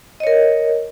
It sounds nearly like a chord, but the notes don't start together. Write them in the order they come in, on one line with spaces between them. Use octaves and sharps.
D#5 C#5 A#4